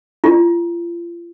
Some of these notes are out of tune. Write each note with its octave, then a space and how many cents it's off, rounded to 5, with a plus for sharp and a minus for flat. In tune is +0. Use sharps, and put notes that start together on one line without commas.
F4 -35